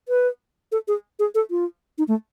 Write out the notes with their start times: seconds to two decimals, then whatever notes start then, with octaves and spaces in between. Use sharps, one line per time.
0.09 B4
0.72 A4
0.88 G#4
1.19 G#4
1.35 A4
1.51 F4
1.98 D#4
2.08 A3